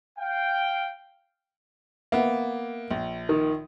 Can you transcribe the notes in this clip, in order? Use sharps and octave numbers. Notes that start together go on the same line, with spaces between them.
F5 G5
A#3 B3 E5
A#1
D#3